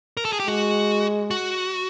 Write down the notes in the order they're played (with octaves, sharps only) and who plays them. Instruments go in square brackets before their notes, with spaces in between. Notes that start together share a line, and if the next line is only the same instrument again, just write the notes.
[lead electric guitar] A#4
A4
G#4
G4
[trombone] G#3 [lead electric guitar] F#4
[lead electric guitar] F#4